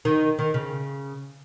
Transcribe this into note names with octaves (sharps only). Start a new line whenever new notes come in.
D#3
D#3
C#3